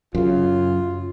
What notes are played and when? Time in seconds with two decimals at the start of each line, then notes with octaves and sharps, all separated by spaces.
0.15 F#2 C#3 F4